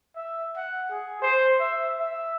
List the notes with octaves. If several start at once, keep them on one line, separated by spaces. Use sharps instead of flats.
E5
F#5
G#4
C5
E5
E5